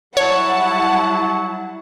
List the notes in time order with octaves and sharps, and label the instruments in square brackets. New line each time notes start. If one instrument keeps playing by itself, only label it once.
[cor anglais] F#3 [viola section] G3 E4 [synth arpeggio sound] C#5 [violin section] F#5 A5